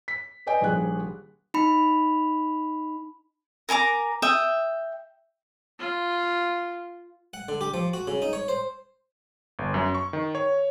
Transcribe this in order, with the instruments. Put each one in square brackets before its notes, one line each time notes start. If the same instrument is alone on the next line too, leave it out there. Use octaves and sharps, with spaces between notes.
[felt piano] B6
B4 D5 D#5 G5 G#5
D#1 A#1 G#4 F#6
[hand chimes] D#4 B5
[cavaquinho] A#4 G#5 A#5 D6
E5 G5 D#6
[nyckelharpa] F4
[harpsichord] F#5
D3
G4
F3
F#4
C#3
D#4
C#5
C5
[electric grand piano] G1
F#2
C#6
D#3
C#5